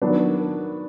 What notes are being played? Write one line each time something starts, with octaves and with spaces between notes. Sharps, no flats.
D#3 F#3 B3 D4